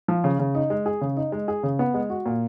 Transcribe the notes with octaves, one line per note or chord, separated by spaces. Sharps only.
F3
C#3
C#3
D#4
G#3
G#4
C#3
D#4
G#3
G#4
C#3
B3
G#3
F#4
A#2